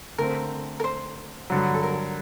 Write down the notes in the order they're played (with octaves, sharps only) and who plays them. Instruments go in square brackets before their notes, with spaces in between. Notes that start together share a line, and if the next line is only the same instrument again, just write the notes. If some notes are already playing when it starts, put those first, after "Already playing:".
[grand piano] D3 A3 C4 [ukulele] A#4
[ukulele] A#4
C5
[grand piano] G2 D3 F#3
[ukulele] A4
A#4